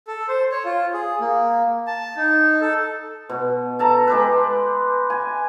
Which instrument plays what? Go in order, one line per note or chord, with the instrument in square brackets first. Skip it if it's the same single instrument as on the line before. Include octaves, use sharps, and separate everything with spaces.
[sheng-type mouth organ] A4
C5
C#5
F4
G#4
A#3
A5
D#4
A4
[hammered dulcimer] B2
A4 A5 A#5
G#3 G4 B4
G#5